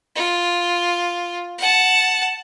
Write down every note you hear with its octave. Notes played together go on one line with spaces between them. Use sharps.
F4
F#5 A5